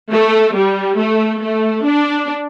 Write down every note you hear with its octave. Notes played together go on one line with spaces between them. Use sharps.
A3
G3
A3
A3
D4